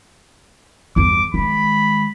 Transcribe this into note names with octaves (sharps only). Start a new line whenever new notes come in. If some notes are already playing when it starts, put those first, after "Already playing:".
G1 E2 D6
D#3 G#3 B5